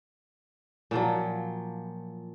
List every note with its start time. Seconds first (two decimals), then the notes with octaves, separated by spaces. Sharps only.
0.91 A#2 F3 F#3